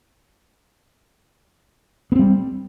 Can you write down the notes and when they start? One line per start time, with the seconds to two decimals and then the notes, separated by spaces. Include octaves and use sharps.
2.12 B3
2.16 C4
2.19 G3